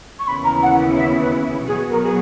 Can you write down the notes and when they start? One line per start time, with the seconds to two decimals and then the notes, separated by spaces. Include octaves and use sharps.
0.18 C#6
0.26 D#2 C#3 E3 B3 E4 B5
0.44 A#5
0.62 F#5
0.97 E5
1.20 B4
1.66 B2 F#3 B3 F#4 G#4
1.90 A#4
2.02 G#4